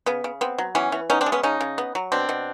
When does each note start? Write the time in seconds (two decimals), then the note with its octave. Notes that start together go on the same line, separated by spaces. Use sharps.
0.06 C#3 B3
0.24 C#3
0.41 B3 C4
0.58 F#3
0.75 E3 B3 C#4
0.92 E3
1.10 B3 C#4 D#4
1.21 C4 D4
1.26 G#3
1.32 B3 C#4
1.43 C#3 C#4 D#4
1.61 C#3
1.78 B3
1.95 F#3
2.12 B2 C4 D4
2.29 B2